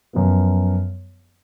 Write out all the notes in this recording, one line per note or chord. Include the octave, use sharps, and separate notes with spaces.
F#2 F3 B3